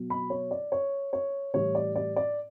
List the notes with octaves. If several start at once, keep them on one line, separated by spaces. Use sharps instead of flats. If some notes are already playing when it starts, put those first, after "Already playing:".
Already playing: B2 F#3
B5
C#5
D5
C#5
C#5
A2 E3 G3 C#5
D5
D5
D5